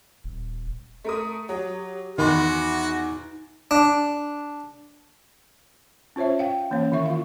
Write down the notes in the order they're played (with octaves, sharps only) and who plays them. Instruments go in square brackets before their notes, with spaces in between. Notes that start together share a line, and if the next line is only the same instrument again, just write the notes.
[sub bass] D#1
[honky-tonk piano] A3 A#4 D#6
[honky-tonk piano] F#3 [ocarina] G4
[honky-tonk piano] E2 B5 C6 [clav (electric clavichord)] D#3 [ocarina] D#4 [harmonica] F#4
[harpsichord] D4
[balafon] C#4 F4 C5 C#5 E5
F5 G5
E3 A#3 C#4 C#5
D#3 E4 E5 C#6
F4 F5